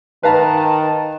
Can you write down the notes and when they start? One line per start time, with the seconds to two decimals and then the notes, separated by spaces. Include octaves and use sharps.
0.23 D#3 B4 F5 A5 A#5